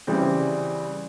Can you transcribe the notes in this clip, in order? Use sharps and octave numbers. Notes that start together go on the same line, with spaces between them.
C#3 E3 G3 C4